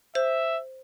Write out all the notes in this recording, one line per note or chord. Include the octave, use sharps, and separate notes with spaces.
C5 E5